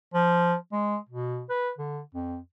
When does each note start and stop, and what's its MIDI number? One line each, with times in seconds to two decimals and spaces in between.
0.14 0.55 53
0.72 0.97 56
1.09 1.44 47
1.50 1.71 71
1.78 2.00 50
2.15 2.37 41